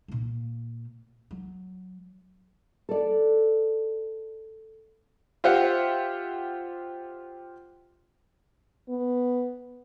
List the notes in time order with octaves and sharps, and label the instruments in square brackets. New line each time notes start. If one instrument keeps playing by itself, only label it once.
[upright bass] A#2 A#3
F#3
[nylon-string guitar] A4 D5
[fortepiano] F4 G4 C5 E5 F#5
[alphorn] B3